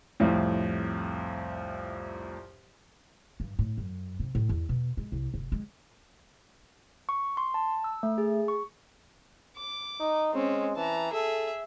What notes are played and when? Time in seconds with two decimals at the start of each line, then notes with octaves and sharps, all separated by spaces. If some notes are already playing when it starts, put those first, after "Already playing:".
0.20 C2 F2 A2
3.40 G2
3.59 A2
3.78 F#2
4.20 C3
4.35 A2
4.49 E2
4.69 B2
4.97 G#3
5.12 C2
5.34 F1
5.52 G#3
7.09 C#6
7.37 C6
7.54 A5
7.84 E6
8.03 A3
8.18 G#4
8.48 C#6
9.57 D6
10.00 D#4
10.33 G#3 C4 C#4
10.76 E3 A5 A#5
11.12 G#4 A4 E5